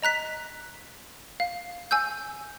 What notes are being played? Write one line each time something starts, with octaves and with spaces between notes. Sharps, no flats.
D#5 A#5 F#6 B6
F5
G#5 E6 G6